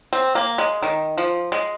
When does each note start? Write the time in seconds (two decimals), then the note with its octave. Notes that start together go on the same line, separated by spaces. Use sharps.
0.13 C4
0.35 A#3
0.58 G#3
0.82 D#3
1.18 F3
1.52 G#3